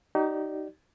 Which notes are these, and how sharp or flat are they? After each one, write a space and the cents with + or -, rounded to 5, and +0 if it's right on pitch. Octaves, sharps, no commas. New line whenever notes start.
D#4 +0 G4 -40 D5 +0